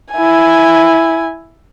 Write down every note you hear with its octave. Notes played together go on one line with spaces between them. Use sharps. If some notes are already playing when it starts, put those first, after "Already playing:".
E4 G#5